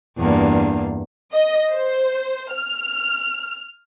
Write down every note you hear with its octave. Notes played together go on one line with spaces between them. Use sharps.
E2 G2 A#3
D#5
C5
F6